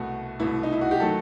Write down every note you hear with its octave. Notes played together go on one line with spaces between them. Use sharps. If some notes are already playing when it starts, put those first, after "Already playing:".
Already playing: C2 B2 A3 F#4
C2 B2 A3 E4
D#4
E4
F#4
G4
D#3 F#3 A3 A4